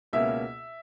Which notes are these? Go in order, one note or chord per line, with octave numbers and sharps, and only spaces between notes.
C#2 B2 A#3 C#4 E5